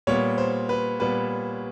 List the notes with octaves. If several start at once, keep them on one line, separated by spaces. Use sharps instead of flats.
A#2 G3 B3 C#5
C5
B4
A#2 G3 B3 B4